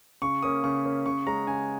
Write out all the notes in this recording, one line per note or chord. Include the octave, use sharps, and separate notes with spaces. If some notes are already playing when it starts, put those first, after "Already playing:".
C#3 C#6
A#3 C#4 D#6
C#3 C#6
A#3 C#4
C#3 C#6
G#3 C#4 A#5
C#3 G#5